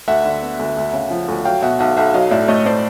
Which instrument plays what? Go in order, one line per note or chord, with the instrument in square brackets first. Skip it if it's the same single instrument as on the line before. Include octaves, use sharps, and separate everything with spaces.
[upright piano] D2 [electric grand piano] E5 F#5
[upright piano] D3
B3
D2
D2
C#3
F3
D2
[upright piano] F#3 [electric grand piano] F5 G5
[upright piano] B2 [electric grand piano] E5 F#5
[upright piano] B1 [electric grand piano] E5 F#5
[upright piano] B1 [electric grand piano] E5 F#5
[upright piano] F#3 [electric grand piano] D#5 F5
[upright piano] A2 [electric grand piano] D5 E5
[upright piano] A3 [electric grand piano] C#5 D#5
[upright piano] A2 [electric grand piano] C5 D5